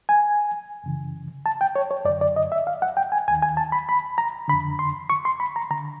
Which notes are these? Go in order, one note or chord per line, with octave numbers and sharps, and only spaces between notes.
G#5
F#2 C#3 E3
A5
G5
C#5
C#5
F#2 D3 D5
D5
D#5
E5
F5
F#5
G5
G#5
D#2 D#3 G#5
G#5
A5
B5
B5
A#5
F2 D3 B5
C6
C#6
C6
B5
A#5
D3 A#5